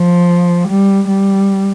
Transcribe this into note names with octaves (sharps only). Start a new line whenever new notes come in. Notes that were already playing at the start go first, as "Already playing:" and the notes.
Already playing: F3
G3
G3